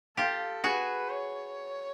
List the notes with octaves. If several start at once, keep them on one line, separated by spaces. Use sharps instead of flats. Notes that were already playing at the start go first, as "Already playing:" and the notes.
F4 G4 A4
F#4 G#4 B4
C#5